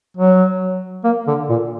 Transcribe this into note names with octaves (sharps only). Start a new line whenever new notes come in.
F#3
A#3
D3
A#2